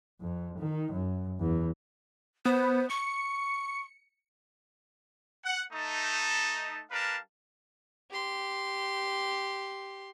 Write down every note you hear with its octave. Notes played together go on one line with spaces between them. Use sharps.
F2
D#3
F#2
E2
B3 C5
C#6 C#7
F#5
A3 D#4 A5
G3 D4 A#4 B4 F5 A5
G4 C6